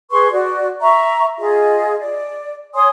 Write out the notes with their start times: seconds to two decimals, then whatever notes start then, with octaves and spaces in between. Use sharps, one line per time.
0.10 G#4 B4 C6 C#6
0.32 F#4 D5
0.81 E5 A#5 C#6
1.39 F4 G#4 D#5
1.99 D5
2.75 C#5 G#5 C6 D#6